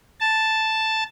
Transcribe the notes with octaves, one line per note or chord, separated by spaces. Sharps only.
A5